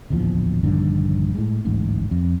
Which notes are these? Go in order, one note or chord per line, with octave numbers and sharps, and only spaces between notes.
D1 A#1 E2 F3
A#1 G2 D3 D#3
A2 G#3
D1 A1 G#2
F2